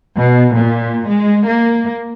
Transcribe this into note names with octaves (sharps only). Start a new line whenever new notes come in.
B2
A#2
G#3
A#3